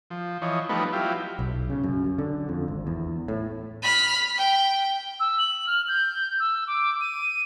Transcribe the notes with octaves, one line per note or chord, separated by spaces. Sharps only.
F3
E3 F3 C#5 D#5
F3 G3 A3 B3 D#4 B4
F#3 E4 F4 G4
B1
C#3
F#2
F#2
D3
F2
G#1
E2
A2
B5 F6
G5
E6
F#7
F6
G6
E6
D6
D#7